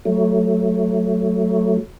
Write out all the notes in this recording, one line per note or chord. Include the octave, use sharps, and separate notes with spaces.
F#3 A3